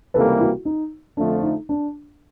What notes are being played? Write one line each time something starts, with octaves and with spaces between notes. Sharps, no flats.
C#2 C3 E3 G3 A#3 A4 B4
E4 F#4
D#4
F2 D3 F3 A3 D4
D#4
D4